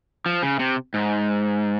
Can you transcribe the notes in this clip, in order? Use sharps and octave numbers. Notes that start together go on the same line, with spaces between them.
F3
C#3
C3
G#2